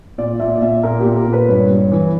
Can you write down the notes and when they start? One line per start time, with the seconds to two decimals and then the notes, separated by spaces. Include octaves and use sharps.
0.18 A#2 D5
0.40 A#2 E5
0.55 D5
0.62 A#2 E5
0.83 A#2 A#4
1.00 G4
1.05 A#2
1.16 A#4
1.27 A#2
1.33 B4
1.49 G2 C#5
1.70 G2
1.92 E3